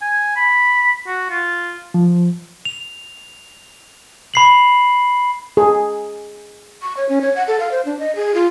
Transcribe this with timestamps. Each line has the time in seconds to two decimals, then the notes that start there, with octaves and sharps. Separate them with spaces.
0.02 G#5
0.36 B5
1.07 F#4
1.31 F4
1.94 F3
2.65 F7
4.34 B5 C7 F#7
5.57 G#4
6.82 C#6
6.97 C#5
7.09 C#4
7.21 C#5
7.36 F#5
7.48 A4
7.60 F5
7.71 C5
7.85 D4
7.99 D#5
8.16 G#4
8.34 F4